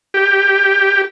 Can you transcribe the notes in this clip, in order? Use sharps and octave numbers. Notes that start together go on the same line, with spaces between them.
G4